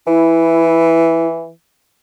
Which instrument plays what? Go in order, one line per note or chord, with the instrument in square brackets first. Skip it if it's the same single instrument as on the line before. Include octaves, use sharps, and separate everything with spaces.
[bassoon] E3 [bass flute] E4